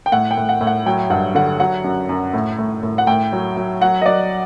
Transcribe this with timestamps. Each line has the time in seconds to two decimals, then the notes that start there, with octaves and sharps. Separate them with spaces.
0.06 G5
0.12 A2 F#5
0.31 G5
0.37 A2
0.49 F#5
0.61 A2
0.67 F#5
0.86 F#3 G5
1.10 G2 F#5
1.35 D3 F#5
1.60 F#3 F#5
1.84 F#2
2.09 F#2
2.34 A2
2.59 A2
2.83 A2
2.98 F#5
3.07 A2 G5
3.33 F#3
3.57 F#3
3.81 F#3 F#5
4.02 D#5
4.06 F#3 D5